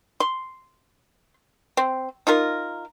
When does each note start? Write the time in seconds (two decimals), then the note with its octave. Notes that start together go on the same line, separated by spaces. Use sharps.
0.20 C6
1.77 C4
2.27 D#4 F4 A#4